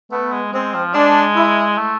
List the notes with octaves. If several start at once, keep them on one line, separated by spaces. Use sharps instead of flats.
A3 B3
G#3
G#3 C4
F3
G#3 D4
E4
A3